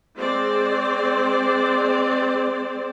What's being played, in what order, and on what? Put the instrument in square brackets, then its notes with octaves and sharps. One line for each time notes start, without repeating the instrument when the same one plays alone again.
[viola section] G#3 C4 C5 D5